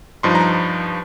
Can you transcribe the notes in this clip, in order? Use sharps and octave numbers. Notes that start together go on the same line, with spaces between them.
G2 F3 D#4 C6
A#5